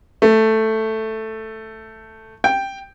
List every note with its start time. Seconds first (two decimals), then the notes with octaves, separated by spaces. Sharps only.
0.22 A3
2.44 G5